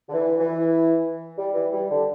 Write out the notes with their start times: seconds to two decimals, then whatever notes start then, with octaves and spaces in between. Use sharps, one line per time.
0.09 D3
0.13 E3
0.39 E3
1.36 G3
1.53 E3
1.72 G3
1.90 D3